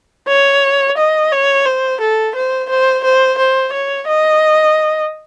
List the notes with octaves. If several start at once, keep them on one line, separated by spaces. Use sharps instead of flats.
C#5
D#5
C#5
C5
A4
C5
C5
C5
C5
C#5
D#5